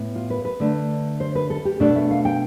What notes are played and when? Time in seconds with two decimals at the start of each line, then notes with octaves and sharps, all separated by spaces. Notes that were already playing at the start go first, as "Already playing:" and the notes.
Already playing: A2 B3
0.15 F4
0.30 B4
0.45 B4
0.60 D3 A3 D4
1.20 C5
1.35 B4
1.50 A4
1.65 G4
1.80 B2 A3 D4 A4
1.96 E5
2.11 F5
2.25 G5